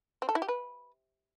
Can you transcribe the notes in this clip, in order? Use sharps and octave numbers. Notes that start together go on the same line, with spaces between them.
C4
A4
E4
G4
B4